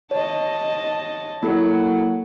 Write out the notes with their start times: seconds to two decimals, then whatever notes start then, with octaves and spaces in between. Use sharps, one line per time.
0.11 C#5 D#5 A5
1.43 F#3 A#3 E4 A4